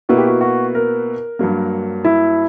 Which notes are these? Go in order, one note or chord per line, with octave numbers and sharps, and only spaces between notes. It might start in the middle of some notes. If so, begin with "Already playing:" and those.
B2 A#3 E4 F#4 B4
G4
F#4
F#4
A#4
G2 F#3 A#3
E4